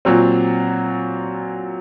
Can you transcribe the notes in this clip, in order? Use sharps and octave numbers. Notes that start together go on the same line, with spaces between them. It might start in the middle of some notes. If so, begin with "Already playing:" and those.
A#2 F#3 C4